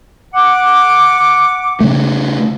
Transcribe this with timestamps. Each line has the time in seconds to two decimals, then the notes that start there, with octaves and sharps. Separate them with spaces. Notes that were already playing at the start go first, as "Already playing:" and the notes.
0.34 F#5 D6
1.80 C#3 A3